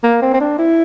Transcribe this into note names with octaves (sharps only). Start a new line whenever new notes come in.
A#3
C4
C4
D4
E4